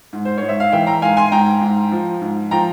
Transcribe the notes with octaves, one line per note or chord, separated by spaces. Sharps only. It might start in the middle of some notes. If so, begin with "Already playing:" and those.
G#2
C5
G#2 C#5
E5
F5
E3 E5 G5
G5 A#5
G#2 F5 G#5
G#5 C6
G#2 G5 A#5
G#2
F3
G#2
F3 G5 A#5